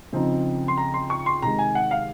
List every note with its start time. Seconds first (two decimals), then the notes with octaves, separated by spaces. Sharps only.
0.13 C#3 F3 C4 D#4
0.68 C6
0.77 A#5
0.94 C6
1.10 C#6
1.26 C6
1.42 C3 D#3 G#3 A#5
1.59 G#5
1.75 F#5
1.91 F5